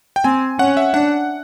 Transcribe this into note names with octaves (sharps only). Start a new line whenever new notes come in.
G5
C4 G#5
C#4 F#5
E5
D4 F#5